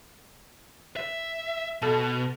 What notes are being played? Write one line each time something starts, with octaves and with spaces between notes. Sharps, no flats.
E5
B2 A4 A5